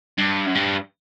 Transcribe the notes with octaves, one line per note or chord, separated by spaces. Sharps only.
G2
F#2
G2